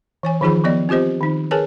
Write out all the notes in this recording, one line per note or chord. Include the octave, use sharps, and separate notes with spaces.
E3 C#5 G#5
D#3 F3 D#4 F4 G#4 B5
F3 B3 D5 D#5
C4 F4 G4 C5 D#5
D#3 D#4
G#4 A#4 B4 C#5 G#5 A5